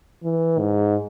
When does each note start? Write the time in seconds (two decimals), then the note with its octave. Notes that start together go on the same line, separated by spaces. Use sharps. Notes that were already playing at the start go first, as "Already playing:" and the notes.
0.23 E3
0.59 G#2